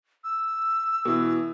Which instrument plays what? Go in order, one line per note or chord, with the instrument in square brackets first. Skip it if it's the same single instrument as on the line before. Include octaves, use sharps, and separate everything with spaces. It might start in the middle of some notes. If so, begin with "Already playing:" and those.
[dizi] E6
[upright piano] B2 E3